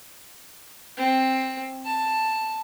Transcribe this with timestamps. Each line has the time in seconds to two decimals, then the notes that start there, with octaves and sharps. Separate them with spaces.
0.97 C4
1.85 A5